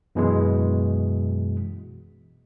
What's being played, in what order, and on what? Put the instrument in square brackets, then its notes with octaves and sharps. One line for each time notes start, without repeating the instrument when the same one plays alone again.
[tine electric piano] F#2 B2 E3 G#3